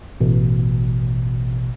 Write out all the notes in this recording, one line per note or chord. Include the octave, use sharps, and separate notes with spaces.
A1 B2